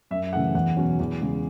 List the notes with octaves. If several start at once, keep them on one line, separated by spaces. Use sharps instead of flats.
F#2 E5
C#3 E3 A3 F#5
E2 F#5
B2 F#3 C#4
E2
C#3 G#3